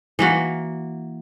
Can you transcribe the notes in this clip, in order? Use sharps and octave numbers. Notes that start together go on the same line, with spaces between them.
E3 A#3 F#4